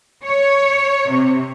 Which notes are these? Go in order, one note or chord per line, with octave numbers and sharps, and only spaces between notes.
C#5
C3